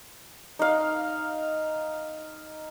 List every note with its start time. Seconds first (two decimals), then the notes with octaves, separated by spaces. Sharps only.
0.59 D#4 F5